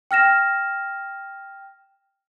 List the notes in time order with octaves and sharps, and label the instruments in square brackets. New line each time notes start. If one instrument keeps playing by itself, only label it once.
[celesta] G5 F6 A#6 E7